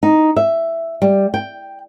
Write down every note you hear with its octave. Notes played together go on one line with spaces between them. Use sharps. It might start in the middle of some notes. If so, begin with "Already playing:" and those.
D#4
E5
G3
G5